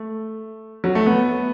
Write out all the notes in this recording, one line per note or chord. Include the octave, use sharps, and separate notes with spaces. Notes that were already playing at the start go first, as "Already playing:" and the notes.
Already playing: A3
F#3
A3
B3